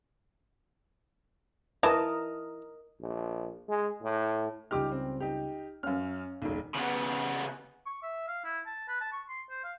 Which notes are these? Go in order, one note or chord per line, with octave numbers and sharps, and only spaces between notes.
E3 A#4 D#5 A5
A#1
G#3
A2
C#2 G3 D#4 G4 D6 F6
C4
D#4 G4
F#2 C#4 F5 F6
E1 B1
C#3 B3
C#6
E5
F5
E4
A5
B4
A5
C#6
C6
C5
F5